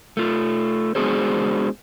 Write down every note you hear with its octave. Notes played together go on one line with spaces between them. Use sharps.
A3 F4
G#3 B3 D4 F#4 G#4 C5